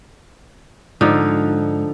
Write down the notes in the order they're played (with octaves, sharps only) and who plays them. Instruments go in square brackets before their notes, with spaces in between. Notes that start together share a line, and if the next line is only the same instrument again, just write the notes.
[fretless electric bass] G#2 [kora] D3 F3 D#4